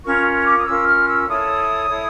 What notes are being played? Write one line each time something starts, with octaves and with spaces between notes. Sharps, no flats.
C#4 F4 A#4 C#6
C#6
D6
D#6
C#4 F4 A#4 E6
F6
E6
E4 A4 C#5 D#6
E4 A4 C#5